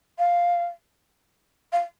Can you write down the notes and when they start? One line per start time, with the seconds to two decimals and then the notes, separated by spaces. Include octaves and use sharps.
0.19 F5
1.72 F5